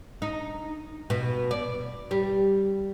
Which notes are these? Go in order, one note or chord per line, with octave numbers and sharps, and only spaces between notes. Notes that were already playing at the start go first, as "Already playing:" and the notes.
D#4
B2
D5
G3